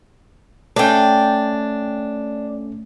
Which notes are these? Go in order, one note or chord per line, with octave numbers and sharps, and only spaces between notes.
A3 C#4 D4 G5